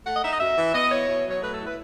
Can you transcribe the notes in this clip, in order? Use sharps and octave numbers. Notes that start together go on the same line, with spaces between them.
A3 F#5
D#5
D#4 E5
D#5
F#2 E5
E3
B3 D#5
E4 C#5
B2
F#3 C#5
A3 B4
A4
E4
B4